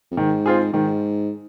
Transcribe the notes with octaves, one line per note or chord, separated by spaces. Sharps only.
F2
G#2 D#3
C4 F4 G#4
G#2 D#3